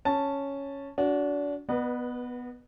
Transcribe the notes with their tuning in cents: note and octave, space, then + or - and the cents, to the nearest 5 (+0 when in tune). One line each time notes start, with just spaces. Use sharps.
C#4 +0 A5 +0
D4 -30 F#4 +0
B3 +0 B4 -25 D#5 -45